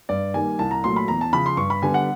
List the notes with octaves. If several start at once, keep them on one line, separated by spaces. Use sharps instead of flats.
G2 D5
D#3 G3 A#3 G#5
C2 A5
A#5
A#2 F#3 A3 C6
B5
E2 A#5
A5
C#3 F3 B5
C6
G2 C#6
B5
D3 G3 B3 G#5
F#5